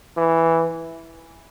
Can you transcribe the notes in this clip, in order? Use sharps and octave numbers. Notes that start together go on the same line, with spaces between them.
E3